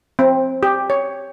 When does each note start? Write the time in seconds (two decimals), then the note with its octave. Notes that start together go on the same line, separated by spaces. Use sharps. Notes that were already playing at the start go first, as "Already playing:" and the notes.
0.19 C4
0.63 G4
0.90 C#5